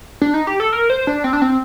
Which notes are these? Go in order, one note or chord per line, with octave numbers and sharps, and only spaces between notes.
D4
D#4
G4
A4
A#4
C5
D4
C4
D4
C4